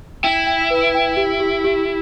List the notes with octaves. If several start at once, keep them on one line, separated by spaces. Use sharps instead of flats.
E4 G5
G5
B4
G5
G4
G4
G4